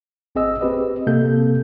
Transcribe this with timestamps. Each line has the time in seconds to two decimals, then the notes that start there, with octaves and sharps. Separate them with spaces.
0.35 G#1 C4 G#4 D#5 E6
0.61 C4 G4 B4 D#5
1.07 C3 A#3 A4 G6